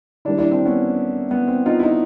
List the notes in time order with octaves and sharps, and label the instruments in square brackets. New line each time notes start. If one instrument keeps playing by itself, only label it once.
[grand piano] D#3 G3 A#3 D4 E4
D4 E4
C4 D4
B3 C#4
B3
C4
D#4 F4
E4
D#4 F4